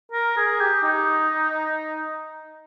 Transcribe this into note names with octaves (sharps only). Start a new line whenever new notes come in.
A#4
G#4
G4
D#4